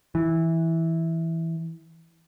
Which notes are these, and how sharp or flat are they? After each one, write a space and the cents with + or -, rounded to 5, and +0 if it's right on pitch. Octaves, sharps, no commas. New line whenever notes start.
E3 -10